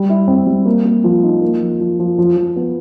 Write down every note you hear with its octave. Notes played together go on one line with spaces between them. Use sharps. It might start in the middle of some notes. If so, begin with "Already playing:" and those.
Already playing: G3
E4
C4
G3
A#3
A#3
F3
D#4
A#3
F3
F3
F3
F3
F3
B3